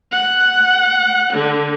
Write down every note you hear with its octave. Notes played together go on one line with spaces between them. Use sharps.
F#5
D3